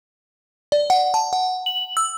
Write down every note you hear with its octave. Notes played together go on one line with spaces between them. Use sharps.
D5
F#5
A5
F#5
F#7
E6